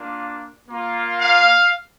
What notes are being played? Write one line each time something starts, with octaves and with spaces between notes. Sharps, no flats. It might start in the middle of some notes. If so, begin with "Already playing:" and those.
Already playing: A#3 D4 F4
A#3 F4
F5